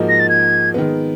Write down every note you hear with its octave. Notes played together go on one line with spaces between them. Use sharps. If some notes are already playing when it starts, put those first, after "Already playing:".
Already playing: G#2 F3 A#3 D#4 F#4
A#6
A6
G#6
D#3 G#3 B3